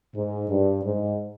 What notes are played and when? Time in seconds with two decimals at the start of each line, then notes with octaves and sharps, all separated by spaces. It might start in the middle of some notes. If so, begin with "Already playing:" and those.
0.14 G#2
0.49 G2
0.84 G#2